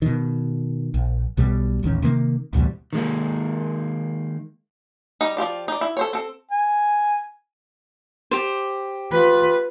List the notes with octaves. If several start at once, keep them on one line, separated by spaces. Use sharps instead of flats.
B2 D#3
A#1
B1 B2 G3
D#1 A1 D#3 C#4
C3 D#3 A#3
A1 D2 B2 G3
D#3 G#3 A#3
G3 D#4
F3 F4 G4 D5
D#4 D5
E4
A4 C5 C#5
C4 A4
G#5
G4 C5
F4 B4